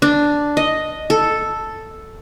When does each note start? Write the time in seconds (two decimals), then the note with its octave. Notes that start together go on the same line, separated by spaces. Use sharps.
0.02 D4
0.57 D#5
1.10 A4